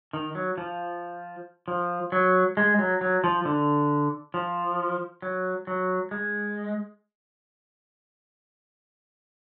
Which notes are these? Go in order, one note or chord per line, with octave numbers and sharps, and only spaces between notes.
D#3
F#3
F3
F3
F#3
G#3
F#3
F#3
F3
D3
F3
F#3
F#3
G#3